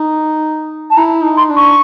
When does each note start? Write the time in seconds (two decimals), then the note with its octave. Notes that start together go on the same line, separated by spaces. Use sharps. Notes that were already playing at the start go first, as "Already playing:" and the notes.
Already playing: D#4
0.90 A5
0.97 E4 A#5
1.23 D#4
1.37 C6
1.50 D4
1.56 C#6